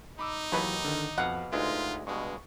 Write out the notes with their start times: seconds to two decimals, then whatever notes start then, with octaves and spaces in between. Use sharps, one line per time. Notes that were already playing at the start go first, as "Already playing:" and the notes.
0.19 D#4 B5 D6 E6
0.52 D#2 B2 E3 F#3 B4 C#5
0.85 D3 D#3
1.18 F2 B2 F5 F#5
1.53 D2 G#3 D#4 F4 B4
2.07 G2 B2 G#3 C#6